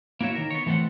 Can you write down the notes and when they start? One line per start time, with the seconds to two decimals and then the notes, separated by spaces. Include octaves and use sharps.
0.21 A#3 E4 F#4 C#5 E5
0.35 D#3 A#4
0.50 B3 C#5
0.66 E3 A3 C4 A4 F#5